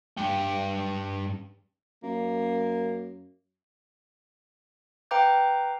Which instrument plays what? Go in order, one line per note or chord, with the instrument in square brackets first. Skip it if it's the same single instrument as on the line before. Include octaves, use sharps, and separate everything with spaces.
[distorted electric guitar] G2 G5
[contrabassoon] F#2 [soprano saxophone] A#3
[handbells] B4 F5 G5 A#5 D6 G6